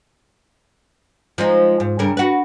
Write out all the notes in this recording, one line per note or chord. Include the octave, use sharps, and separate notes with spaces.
F3 G#3 D#4
G#2
G2 C#3 A#4
F#4 B4